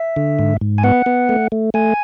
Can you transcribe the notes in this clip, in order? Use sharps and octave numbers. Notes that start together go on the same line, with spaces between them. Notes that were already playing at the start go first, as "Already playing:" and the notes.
Already playing: E5
D3
G#2
G#2
G#5
B3 F#5
B3
A3
A3
A3 G#5